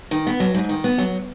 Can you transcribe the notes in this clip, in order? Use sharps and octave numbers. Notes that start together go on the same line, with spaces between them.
D#3
B3
F#3
G#2
D#3
B3
F#3